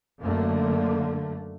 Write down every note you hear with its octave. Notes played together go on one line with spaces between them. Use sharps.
F#2 D3 A3 A#3